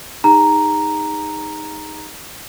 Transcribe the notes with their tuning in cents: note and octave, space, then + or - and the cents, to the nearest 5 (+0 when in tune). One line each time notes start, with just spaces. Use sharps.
D#4 +0 G#4 -30 A#5 +0